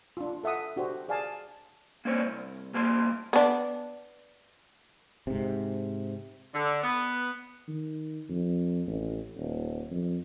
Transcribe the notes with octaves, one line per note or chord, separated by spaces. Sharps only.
D4 F4
A4 E5 F#5 D#6
D4 F#4 G4 C5
G#4 D5 F5 G#5 A5
A#3 C#4 D4 C5 C#5
C2
C2 A#2 A#3 C5 A5 C6
B3 D4
G#2 C3
D3
B3
D#3
F2
A1
D#1
F2